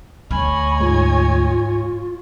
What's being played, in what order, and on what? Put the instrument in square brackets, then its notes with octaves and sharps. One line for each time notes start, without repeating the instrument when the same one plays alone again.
[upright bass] D2 [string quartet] C#5 D#5 G#5 [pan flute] B5
[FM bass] G#2 [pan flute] F4